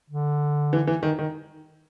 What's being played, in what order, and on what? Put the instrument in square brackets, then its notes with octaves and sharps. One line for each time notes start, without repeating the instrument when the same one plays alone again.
[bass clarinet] D3
[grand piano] E3
E3
D#3
D#3